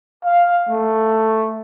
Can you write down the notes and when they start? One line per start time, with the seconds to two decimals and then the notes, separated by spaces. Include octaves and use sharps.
0.25 F5
0.69 A3